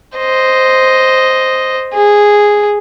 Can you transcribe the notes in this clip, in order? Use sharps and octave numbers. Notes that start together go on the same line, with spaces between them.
C5 D#5
G#4